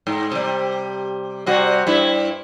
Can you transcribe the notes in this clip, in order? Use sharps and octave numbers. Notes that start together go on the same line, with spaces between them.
G#2
C3 G3
C3 G3 F#4
G2 E4